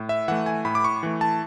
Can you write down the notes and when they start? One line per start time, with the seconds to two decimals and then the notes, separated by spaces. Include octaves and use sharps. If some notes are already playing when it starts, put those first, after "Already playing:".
Already playing: A2
0.09 E5
0.28 E3 A3 F#5
0.46 G#5
0.65 A2 B5
0.75 D6
0.84 C#6
1.03 E3 A3
1.21 A5